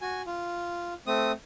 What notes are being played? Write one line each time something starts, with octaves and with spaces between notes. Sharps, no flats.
F#4 G#5
F4
A3 C4 D#6